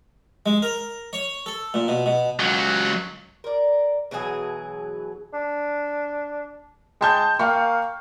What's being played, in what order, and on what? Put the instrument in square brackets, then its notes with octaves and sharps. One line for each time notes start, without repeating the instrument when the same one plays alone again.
[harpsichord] G#3
A#4
C#5
A4
A#2
B2
B2
[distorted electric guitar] C#2 F#3
[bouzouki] A#4 D5
B2 E3 F#3 G#4
[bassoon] D4
[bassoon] G#3 [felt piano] G5 A5 G6
[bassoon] A#3 [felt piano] F5 G5 C#6